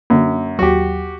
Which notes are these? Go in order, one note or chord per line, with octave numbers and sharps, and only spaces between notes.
F#2 D3 A#3
D#2 F#3 F#4 G4